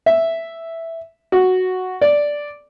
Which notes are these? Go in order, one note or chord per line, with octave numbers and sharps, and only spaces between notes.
E5
F#4
D5